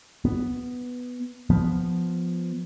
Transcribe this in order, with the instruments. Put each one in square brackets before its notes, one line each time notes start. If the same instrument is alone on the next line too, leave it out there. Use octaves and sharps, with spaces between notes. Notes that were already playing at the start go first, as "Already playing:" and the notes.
[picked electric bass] B3
F3 B3